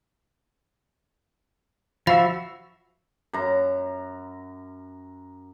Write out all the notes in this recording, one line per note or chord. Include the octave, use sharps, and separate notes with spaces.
F3 F#4 E5 F5 B5 A6
F#2 A#5